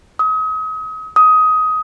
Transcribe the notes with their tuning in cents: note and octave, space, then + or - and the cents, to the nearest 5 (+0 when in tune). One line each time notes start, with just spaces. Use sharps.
D#6 +35
D#6 +15